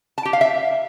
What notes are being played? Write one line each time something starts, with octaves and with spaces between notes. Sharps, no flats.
A5
G4
F5
E5